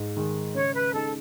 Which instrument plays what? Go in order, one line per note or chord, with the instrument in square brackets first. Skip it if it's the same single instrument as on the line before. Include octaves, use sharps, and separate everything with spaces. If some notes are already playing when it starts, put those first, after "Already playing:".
Already playing: [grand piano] G#2
D#3 G#3
[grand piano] C#3 [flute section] C#5
[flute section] B4
[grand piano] G#3 D#4 [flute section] A4